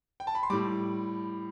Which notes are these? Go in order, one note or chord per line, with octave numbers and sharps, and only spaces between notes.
G5
A5
B5
C6
A2 G3 D6